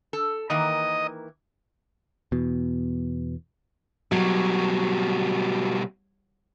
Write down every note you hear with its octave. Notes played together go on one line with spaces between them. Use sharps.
A4
D#3 E3 A#3 D#5
E2 B2
B2 F#3 G3